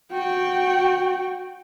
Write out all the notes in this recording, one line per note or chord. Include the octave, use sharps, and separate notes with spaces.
F#4 G5